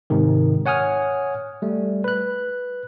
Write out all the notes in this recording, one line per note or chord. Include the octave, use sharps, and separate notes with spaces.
G#2 C3 D#3
C#5 F#5 G#5 D#6 F6
G3 A3
B4 F#6